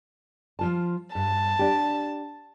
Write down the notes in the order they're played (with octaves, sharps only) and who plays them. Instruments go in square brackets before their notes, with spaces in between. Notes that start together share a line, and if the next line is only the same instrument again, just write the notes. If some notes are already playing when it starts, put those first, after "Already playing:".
[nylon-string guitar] F3 F4 A5
[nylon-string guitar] G2 [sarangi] A5
[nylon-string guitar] D4 G4